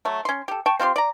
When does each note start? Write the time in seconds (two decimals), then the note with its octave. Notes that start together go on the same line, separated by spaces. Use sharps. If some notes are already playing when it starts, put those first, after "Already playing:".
0.05 F#3 A3
0.25 C#4 C6
0.48 G4 A4
0.66 G5 A5 C#6
0.79 C4 F4 G4 C6
0.96 D5 A#5